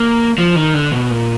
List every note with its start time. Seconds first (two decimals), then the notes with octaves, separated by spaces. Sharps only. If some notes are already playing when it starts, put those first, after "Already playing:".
Already playing: A#3
0.38 F3
0.56 D#3
0.74 D3
0.92 B2
1.10 A#2